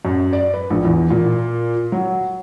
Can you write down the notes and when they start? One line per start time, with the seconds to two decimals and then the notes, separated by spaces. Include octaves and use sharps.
0.05 F#2
0.33 D5
0.54 B4
0.70 A#1
0.85 E2
1.10 A#2
1.92 F#3